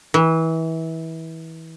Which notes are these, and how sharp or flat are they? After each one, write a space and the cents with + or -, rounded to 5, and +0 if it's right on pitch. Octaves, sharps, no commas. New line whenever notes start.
E3 -25